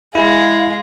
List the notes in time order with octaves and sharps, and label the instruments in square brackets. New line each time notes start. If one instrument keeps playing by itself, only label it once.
[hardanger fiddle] G#3 G#4 [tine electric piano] E4 [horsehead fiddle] F5